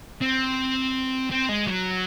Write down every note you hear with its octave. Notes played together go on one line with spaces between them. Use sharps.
C4
C4
G#3
F#3